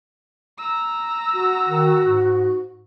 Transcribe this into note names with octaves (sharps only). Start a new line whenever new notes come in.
A#5 E6
F#4
D#3
G#2